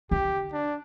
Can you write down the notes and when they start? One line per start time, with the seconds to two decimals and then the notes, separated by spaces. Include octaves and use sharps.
0.11 D3 G4
0.53 D4